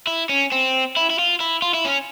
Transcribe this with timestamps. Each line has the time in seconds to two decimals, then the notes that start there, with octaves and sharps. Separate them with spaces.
0.07 E4
0.29 C#4
0.52 C4
0.96 E4
1.10 E4
1.19 F4
1.40 E4
1.62 F4
1.74 E4
1.85 C#4